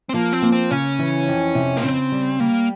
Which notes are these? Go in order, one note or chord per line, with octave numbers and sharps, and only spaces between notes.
C4
F3 A#3
C4
A#3
C4
C#3 C#4
E3
F2
C3
A#3
C#3 C4
G3
G3 A#3